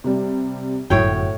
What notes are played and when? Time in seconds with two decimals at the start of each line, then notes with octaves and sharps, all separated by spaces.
0.04 C3 G3
0.90 G1 F#2 A2 F#3 F#4 C#5 G5